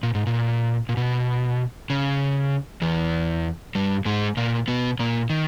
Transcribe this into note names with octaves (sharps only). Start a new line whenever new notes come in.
A#2
G#2
A#2
A#2
B2
C#3
E2 E3
G2 G3
G#2 G#3
A#2 A#3
B2 B3
A#2 A#3
D#3